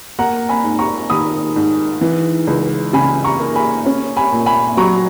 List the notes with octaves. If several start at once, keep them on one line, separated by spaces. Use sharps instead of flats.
A#3 F#5 A#5
G#5 B5
G#2
A#5 C#6
D#3 B5 D#6
G#2
E3
C#2
C#3 G#5 B5
A#5 C#6
A#3
G#5 B5
C#4
G#5 B5
A#2
G#5 B5
F#3 A#5 C#6